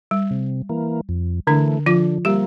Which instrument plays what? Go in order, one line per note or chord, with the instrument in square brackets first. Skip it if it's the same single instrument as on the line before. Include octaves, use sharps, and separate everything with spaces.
[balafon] G3
[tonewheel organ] C3
E3 A#3
F2
[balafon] D3 D4 [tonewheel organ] E3 A3
[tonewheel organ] D3 [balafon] F3 F4
[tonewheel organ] F3 A#3 [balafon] G3 G4